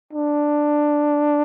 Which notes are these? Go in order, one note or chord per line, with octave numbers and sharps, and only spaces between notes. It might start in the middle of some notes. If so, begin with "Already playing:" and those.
D4